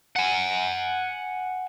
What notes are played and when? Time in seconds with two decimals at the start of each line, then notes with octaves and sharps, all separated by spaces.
0.16 F#5 G#5